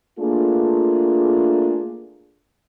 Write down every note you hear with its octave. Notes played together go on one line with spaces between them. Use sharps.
A3 A#3 D4 F4 G#4